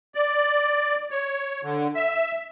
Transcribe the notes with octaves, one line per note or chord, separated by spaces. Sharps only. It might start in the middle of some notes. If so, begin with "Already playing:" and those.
D5
C#5
D3
E5